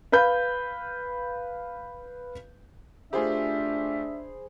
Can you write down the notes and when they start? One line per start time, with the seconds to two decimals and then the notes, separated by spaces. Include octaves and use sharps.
0.12 B4 F5 B5 G6
3.13 A3 D4 F4 G4 G#4 C5 E5 B5